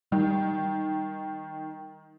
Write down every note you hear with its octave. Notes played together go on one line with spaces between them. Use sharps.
D#3 G3